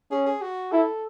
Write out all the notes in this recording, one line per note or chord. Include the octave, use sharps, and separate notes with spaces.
C#4 G#4
G#4
F#4
E4 A4